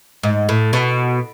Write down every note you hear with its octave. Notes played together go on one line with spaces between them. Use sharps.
G#2
A2
B2